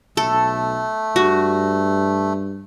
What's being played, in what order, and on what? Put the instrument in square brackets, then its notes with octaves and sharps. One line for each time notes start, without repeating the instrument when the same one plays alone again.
[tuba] B1 [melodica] A3 [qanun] A4
[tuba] G2 [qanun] F#4